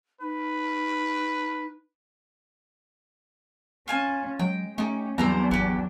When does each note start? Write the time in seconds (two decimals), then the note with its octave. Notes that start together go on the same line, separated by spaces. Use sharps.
0.21 D#4 B4
3.88 C#4 F4 G#5 A5
4.40 F#3 G#3 G5
4.78 A3 C#4 D#4 G4
5.18 E2 F#3 G3 C4 D4 C5 A#5
5.51 G#1 F#4 G4